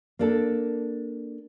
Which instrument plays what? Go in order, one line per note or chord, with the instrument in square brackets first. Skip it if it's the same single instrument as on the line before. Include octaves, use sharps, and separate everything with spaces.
[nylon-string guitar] A#3 D4 A4